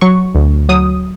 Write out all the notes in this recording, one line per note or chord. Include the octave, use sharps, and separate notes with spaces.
F#3 C#6
D2
F#3 D#6